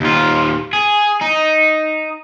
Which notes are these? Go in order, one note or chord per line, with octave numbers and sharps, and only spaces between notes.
D#2 F4
G#4
D#4